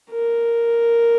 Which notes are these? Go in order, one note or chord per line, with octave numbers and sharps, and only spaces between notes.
A#4